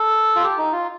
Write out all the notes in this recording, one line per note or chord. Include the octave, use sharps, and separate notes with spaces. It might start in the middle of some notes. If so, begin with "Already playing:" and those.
Already playing: A4
F4
G4
D#4
F4